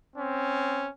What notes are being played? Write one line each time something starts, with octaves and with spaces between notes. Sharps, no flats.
C4 C#4